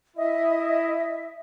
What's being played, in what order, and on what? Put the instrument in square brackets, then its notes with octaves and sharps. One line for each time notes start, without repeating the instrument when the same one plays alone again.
[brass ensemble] E4 [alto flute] D#5 [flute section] E5